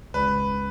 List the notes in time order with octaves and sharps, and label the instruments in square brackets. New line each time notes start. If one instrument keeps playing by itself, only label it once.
[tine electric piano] C#2 [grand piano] B4